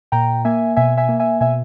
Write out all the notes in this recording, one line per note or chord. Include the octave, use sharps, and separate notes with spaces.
A#2 G5 A#5
A#3 E5 G#5
B2 E5 G#5
E5 G#5
A#3
E5 G#5
B2 E5 G#5